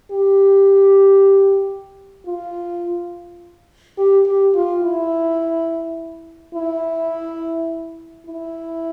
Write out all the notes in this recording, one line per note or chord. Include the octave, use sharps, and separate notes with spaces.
G4
F4
G4
G4
F4
E4
E4
E4